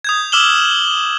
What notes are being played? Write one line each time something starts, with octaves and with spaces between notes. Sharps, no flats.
D#6 G6 G#6
D6 E6 F6 E7 F#7 G7